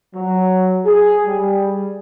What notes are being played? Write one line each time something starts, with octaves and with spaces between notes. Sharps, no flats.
F#3
G#4
G3